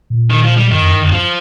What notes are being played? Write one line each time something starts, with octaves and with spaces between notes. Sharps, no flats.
A#2
D#3
F3
G3
G2 D#3
F2
G2
F2
G2 F3